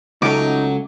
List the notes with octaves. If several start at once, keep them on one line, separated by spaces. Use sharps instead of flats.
C#2 F#3 A3 C#4 D#4 D6